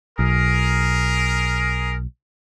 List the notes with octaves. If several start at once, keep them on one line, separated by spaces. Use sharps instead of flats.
B1 G#4 A#4